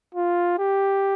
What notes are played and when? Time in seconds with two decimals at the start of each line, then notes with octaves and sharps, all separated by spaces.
0.15 F4
0.59 G4